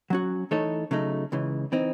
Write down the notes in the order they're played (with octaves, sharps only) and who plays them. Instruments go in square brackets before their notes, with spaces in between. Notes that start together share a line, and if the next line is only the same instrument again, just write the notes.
[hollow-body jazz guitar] F#3 C#4 F#4
E3 A3 D#4 A4 C#5
C#3 F#3 A3 D#4
C#2 C#3 E3
E3 C4 D#4